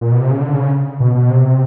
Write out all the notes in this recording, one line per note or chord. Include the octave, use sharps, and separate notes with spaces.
A#2
B2
C3
C#3
D3
C#3
B2
B2
C3